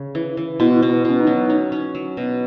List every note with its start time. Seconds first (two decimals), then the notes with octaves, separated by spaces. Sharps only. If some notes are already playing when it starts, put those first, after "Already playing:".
Already playing: C#3
0.15 E3
0.37 E3
0.60 B2 E4
0.83 B2
0.89 E4
1.05 B2 C#4
1.20 D#4
1.27 F#3
1.49 C#4 D#4
1.72 C#4
1.95 F#3
2.17 B2